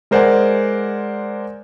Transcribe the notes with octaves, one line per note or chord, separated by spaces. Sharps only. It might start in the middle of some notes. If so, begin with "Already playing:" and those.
G#3 A#4 C5 D5 F#5 G#5